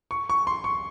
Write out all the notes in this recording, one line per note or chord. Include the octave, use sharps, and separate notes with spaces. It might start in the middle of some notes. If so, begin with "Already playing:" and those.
C#6
C#6
C6
C#6